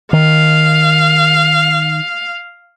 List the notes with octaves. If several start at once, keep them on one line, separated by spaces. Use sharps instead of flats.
D#3 F5